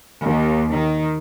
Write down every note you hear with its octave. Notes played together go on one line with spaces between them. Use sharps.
D#2
D#3